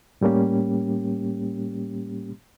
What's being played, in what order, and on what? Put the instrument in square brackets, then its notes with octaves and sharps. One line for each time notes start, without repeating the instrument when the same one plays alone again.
[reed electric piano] A2 G3 A#3 C#4 G4